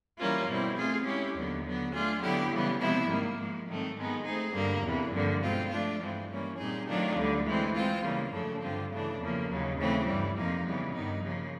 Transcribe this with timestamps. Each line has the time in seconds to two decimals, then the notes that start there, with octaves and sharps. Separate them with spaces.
0.18 E3 G3 A#3 C#4 F4
0.48 B2 G3 C4 E4
0.77 A3 C4 F4 G#4
1.06 G#3 C#4 E4 G4
1.35 D#2 D3 F#3 B3
1.64 D3 F#3 B3
1.93 A3 D4 F4 G#4
2.21 D3 F#3 B3 E4 G4
2.51 C#3 E3 G3 B3
2.80 C3 F3 G#3 B3 E4
3.09 G#2 D#3 G3 A#3
3.38 G#2 F3 G#3
3.68 G#2 D#3 F#3 A3 C4
3.97 G#2 D#3 G#3 B3 D#4
4.25 A3 C4 D#4 G#4
4.54 G2 D3 G3 A#3
4.83 E2 C3 E3
5.12 G2 D3 F3 A#3
5.42 B2 G#3 C4 F4
5.70 F3 A3 D4 F4
6.00 G2 E3 G#3 C4
6.29 E3 G3 A#3 C#4
6.58 A#2 G3 C4 D#4 G#4
6.87 D#3 F#3 A3 D4 F4
7.17 D2 D3 G3
7.45 E3 G#3 C4
7.74 G#3 C4 F4
8.03 C#3 E3 G3 A#3
8.32 F#2 C#3 F3 A3 D4
8.62 G2 D3 G3 C4 F4
8.90 C#3 E3 A3 D4
9.20 E2 C#3 F3 A#3
9.48 D#2 C#3 F#3
9.78 C#3 E3 A3 C4
10.06 G2 E3 G3
10.36 F2 C3 F3 A#3 D#4
10.65 C#3 E3 G3 B3
10.93 G2 D#3 G3 B3 D#4
11.23 C#3 F3 A#3